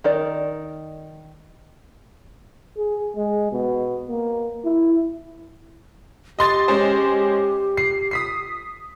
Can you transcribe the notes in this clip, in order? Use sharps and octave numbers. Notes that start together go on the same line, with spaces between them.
D#3 A#4 D5
G#4
G#3
B2
A#3
E4
G4 D#5 C6 A6
G#3 C#4 C5
C7
D#6 B6 C7